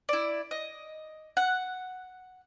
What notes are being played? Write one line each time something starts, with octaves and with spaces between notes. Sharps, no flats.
E4 D5
D#5
F#5